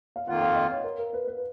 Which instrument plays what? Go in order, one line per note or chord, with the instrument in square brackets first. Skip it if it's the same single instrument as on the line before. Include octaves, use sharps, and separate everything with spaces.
[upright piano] F5
[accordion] F2 D#3 A#3 F4 [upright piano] F#5
[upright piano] F5
D#5
C#5
A#4
A#4
B4
B4